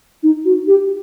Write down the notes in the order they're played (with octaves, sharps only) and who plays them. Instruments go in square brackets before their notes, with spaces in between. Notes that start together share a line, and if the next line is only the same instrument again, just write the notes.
[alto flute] D#4
F#4
G4